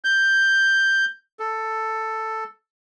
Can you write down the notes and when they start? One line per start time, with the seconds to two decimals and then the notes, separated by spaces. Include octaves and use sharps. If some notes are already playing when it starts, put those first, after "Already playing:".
0.04 G6
1.40 A4